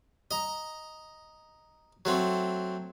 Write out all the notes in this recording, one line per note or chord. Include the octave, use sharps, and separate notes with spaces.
D#5 A#5
F#3 A3 C4